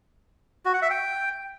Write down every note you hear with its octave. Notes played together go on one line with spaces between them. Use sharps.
F#4
F#5
E5
G5